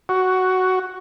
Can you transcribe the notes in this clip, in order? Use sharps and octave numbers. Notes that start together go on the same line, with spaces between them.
F#4